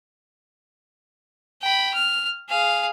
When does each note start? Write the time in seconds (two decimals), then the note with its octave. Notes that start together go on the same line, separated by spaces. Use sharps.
1.62 G5 B5
1.94 F6
2.49 G#4 F5